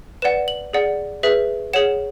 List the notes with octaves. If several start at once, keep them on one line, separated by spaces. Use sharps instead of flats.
B4 D5 F#5 E7
F#7
G#4 D5 F#5
G#4 B4 E5
G#4 C#5 F#5 E7